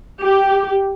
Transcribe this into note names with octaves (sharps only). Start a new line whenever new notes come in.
G4